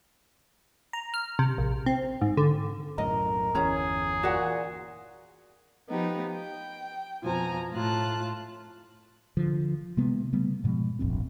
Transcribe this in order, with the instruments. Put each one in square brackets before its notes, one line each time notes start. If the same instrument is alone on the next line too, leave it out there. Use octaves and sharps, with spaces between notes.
[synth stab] A#5
F6
C3
A#1
C4
G#2
D3
[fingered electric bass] B1 F#2 A2 [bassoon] A#4 [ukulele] D#5
[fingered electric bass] G1 E2 E3 [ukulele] C#4 C#5 A#5 [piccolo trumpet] G#4
[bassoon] A#2 [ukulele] F#4 D5 F#5
[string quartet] F3 B3 D#4 G4
G5
F2 B2 F3 G#5 A#5
A2 F4 A5 F#6
[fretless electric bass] D3 F3
C3 G#3 A#3 B3
C#3 G3 A3 B3
G#2 B2 F3 G#3
D#1 A#1 F2 C4